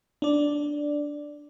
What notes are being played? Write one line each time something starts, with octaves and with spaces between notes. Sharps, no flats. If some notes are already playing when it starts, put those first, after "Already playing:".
D4 D5